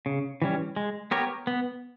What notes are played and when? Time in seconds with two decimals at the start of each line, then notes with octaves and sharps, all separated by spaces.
0.06 C#3
0.42 E3 G3 C#4
0.76 G#3
1.11 B3 G4 A#4 C#5
1.47 B3